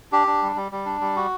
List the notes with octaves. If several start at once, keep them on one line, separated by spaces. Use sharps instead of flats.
D4 G4
D4
G3
G3
G3
D4
G3
F#4